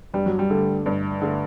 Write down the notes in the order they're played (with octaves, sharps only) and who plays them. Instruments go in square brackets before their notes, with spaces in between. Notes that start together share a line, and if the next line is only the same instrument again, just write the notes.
[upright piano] G2 [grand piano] G3
[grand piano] F#3
G3
[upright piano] D3 A3
G2
D3 A3